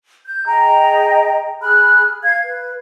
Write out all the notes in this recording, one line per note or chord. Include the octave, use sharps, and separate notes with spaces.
G6
G#4 D#5 G5 A#5
G#4 B5 F6 F#6
F5 G#6
B4